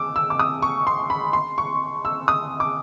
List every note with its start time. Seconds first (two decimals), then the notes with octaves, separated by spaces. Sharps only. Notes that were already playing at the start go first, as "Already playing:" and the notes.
Already playing: D6 E6
0.16 E6
0.30 D6
0.39 D#6
0.62 C#6
0.87 C6
1.10 B5
1.33 C6
1.58 C#6
2.05 E6
2.28 D#6
2.60 D6